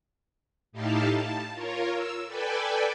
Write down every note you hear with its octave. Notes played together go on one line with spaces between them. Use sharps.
A2 D#4 E4 G4 F5 A5
A5
F4 A#4 C#5
E6
A4 B4 D5 G5 G#5